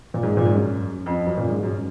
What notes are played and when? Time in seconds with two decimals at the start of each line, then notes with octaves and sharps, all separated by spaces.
0.14 A#2
0.23 G#2
0.37 A#2
0.46 G#2
0.54 F#2
1.06 F2
1.27 F#2
1.37 A#2
1.48 G#2
1.63 F#2